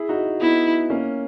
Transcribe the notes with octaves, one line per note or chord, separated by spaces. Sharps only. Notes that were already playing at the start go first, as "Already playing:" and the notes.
Already playing: E4 G#4
D#4 F#4
B3 D#4 E4
A#3 C#4